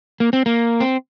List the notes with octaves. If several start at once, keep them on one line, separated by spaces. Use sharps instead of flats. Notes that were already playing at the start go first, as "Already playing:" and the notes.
A#3
C4
A#3
C4